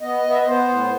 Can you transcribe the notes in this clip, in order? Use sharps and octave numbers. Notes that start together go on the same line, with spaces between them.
B3 D#5
B3
E5
D#5
B3 C5
A2